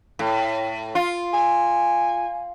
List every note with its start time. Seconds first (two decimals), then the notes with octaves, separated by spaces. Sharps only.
0.19 A2
0.95 F4
1.34 G#5